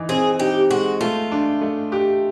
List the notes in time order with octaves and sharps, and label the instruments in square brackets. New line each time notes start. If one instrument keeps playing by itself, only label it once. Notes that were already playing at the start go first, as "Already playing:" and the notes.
Already playing: [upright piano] E3 D#4
[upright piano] C4 [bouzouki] G#4
[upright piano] D#4 [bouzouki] G4
[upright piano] G#3 [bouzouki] F#4
[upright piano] A3 [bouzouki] F4
[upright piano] D4
A3
G4